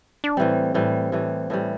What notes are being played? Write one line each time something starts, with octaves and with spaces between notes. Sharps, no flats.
D4
A2 E3 G3 C4
A2 E3 G3
A2 E3 G3
A2 E3 G3